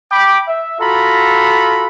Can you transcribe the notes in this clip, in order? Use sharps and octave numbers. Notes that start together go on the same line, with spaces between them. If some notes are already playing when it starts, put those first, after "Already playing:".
G5 B5 D6
E5
F4 F#4 A4 A#5 B5